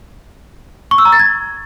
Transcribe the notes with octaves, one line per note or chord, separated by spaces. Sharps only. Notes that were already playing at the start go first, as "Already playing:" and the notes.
C#6
E6
A#5
A6
G#6